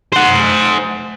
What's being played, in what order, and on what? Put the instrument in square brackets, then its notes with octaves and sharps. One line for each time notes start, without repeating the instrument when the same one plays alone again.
[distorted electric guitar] C5 F#5